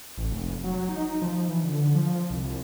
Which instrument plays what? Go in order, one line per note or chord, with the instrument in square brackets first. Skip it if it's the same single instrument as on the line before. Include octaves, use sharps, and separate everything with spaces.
[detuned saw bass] A1
F1
F#3
D#4
F3
E3
D3
F3
C2